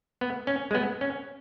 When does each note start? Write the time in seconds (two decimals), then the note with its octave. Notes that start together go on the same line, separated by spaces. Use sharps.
0.21 B3
0.47 C#4
0.71 G#3
0.75 B3
1.01 C#4